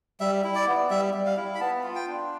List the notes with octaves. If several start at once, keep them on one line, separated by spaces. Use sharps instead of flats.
G3 E5
E4
D5
B3
G3 E5
G3
F5
E4
B5
B3 A5
F4
G5
D4